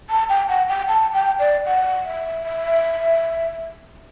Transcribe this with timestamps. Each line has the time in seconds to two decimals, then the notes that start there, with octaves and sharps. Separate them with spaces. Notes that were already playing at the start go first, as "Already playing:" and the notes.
0.10 A5
0.29 G5
0.49 F#5
0.68 G5
0.88 A5
1.13 G5
1.39 D5
1.66 F#5
2.05 E5
2.44 E5